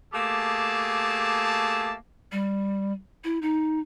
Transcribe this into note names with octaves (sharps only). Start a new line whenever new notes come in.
A3 A#3 G4 G#4 A5
G3
E4
D#4